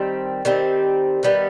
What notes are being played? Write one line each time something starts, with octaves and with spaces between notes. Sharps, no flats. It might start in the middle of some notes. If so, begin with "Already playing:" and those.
Already playing: D#3 G3 C4
D#3 G3 C4
D#3 G3 B3